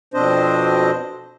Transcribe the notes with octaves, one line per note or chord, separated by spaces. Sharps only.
F2 B2 C4 D4 C5 D#5